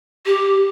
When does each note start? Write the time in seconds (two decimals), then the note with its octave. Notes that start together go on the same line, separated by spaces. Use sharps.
0.25 G4